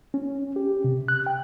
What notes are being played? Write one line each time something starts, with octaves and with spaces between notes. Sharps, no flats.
C#4
G4
C3
F#6
G5